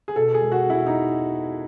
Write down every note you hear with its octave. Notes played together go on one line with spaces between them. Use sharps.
G#4
B2 A4
E1 G#4
F#4
E1
E4
D#4